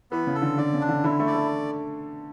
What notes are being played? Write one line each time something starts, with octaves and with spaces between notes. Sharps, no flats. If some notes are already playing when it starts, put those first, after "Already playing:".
E3 B3
C#3
A4
D3
D3 D5
C#3
D4
D3
D3 E4
A3
D5
A3